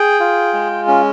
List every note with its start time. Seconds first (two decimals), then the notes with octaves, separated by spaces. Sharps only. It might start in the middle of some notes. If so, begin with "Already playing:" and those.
Already playing: G#4 G5
0.20 F4
0.53 G#3
0.88 C#4